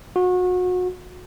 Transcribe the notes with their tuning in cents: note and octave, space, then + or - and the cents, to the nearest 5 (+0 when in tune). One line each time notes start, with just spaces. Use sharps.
F#4 -30